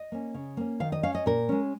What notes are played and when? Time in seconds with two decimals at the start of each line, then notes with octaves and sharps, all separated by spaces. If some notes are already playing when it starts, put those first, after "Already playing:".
Already playing: D#5
0.12 A#3 C#4
0.34 C#3
0.57 A#3 C#4
0.80 D#3 F5
0.92 D#5
1.03 C#4 F5
1.15 D#5
1.26 A#2 A#4
1.49 G#3 C#4